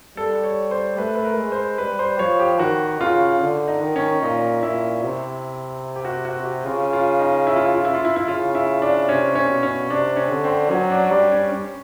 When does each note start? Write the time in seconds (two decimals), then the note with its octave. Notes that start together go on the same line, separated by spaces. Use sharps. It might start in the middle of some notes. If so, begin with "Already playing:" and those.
0.17 G3 A4
0.44 C#5
0.71 C5
0.98 A3 B4
1.15 B4
1.25 A#4
1.38 G#3
1.52 C5
1.78 G3 B4
1.99 C5
2.19 F3 C#5
2.39 G4
2.59 D#3 F#4
3.01 C#3 F4
3.41 D3
3.68 D#4
3.81 D#3
3.96 C#4
4.22 A#2 D#4
4.63 A#2 E4
5.03 C3
5.96 G4
6.05 F#4
6.25 F#4
6.40 F#4
6.45 G4
6.65 C#3 F4
6.93 F4
7.19 D#4
7.47 E4
7.56 F4
7.66 E4
7.75 F4
7.85 E4
7.95 F4
8.05 E4
8.16 E4
8.27 C#3 F4
8.55 E4
8.82 D4
9.08 C3 C#4
9.35 C#4
9.49 B2
9.63 C#4
9.90 C3 D4
10.17 C#4
10.30 D3
10.44 C4
10.70 F#3 C#4
10.91 D4
11.12 G3 D4
11.32 C#4
11.52 C#4